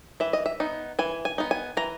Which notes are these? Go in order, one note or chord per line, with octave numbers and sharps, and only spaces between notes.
E3 E5
D#5
E5
B3 D#4
E3 G#5
G#5
B3 D#4
G#5
E3 A#5